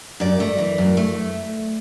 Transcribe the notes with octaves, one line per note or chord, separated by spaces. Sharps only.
F#2 D5
A3
E3
F#2
A3